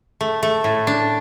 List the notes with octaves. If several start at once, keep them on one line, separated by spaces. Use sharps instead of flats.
A3
A3
A2
D4